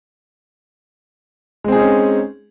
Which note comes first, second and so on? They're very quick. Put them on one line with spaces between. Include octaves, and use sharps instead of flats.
G#3 C4 G#4 D#4 C#4